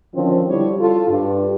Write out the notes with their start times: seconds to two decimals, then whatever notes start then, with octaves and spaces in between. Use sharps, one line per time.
0.14 D3 D#3 F3 C4 C#4 F4
0.48 D3 G3 E4 C#5
0.79 F4 A4
1.09 G2